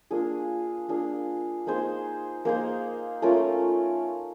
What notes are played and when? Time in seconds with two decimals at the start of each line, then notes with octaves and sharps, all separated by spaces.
0.11 A#3 D4 F4 G#4
0.89 A#3 D4 F4 G#4
1.67 A#3 D#4 G#4 C5
2.45 A#3 D#4 G#4 C5
3.22 A3 C#4 F4 A#4